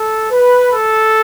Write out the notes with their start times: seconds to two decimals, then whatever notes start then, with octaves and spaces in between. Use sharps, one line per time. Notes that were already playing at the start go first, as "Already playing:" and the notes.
Already playing: A4
0.31 B4
0.71 A4